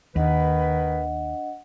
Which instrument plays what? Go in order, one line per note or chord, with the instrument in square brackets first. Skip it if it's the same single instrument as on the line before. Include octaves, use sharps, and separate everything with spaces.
[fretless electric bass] D#2 [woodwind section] D#3 B4 [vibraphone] D4 D#5 F#5